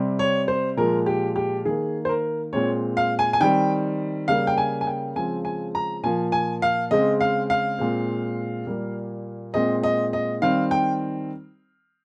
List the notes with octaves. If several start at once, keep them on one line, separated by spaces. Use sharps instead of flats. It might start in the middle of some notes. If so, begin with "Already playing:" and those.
Already playing: C3 G3 C4
C#5
C5
A#2 F3 G#3 A#4
G4
G4
D#3 A#3 G#4
C5
A#4
A#2 G#3 C4 C#5
F5
G#5
G#5
D#3 G3 C4 G5
C#3 G3 A#3 F5
G5
G#5
G#5
G5
C#3 F3 G#3 C4 G#5
G#5
A#5
A#2 F3 A#3 G#5
G#5
F5
C#3 G#3 C4 D#5
F5
F5
A#2 G#3 C4
A#2 G3 A#3
A#2 G#3 C4 D#5
D#5
D#5
D#3 G3 C4 F5
G5